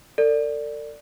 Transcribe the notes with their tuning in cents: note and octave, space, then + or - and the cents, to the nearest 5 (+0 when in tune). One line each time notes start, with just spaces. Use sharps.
A4 +40 D5 +0